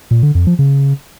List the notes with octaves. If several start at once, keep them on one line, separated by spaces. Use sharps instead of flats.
A#2
D3
F2
F3
C#3